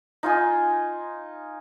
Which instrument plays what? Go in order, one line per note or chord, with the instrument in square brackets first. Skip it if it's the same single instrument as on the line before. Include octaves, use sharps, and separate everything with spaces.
[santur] D#4 F4 D#5 G#5